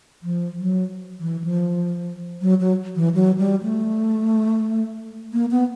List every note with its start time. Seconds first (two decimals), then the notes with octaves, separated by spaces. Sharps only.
0.23 F3
0.59 F#3
1.20 E3
1.44 F3
2.41 F#3
2.60 F#3
2.96 E3
3.14 F#3
3.38 G3
3.63 A3
5.33 A#3
5.51 B3